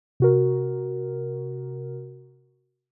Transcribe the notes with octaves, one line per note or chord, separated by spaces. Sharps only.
C3 F#4 A#4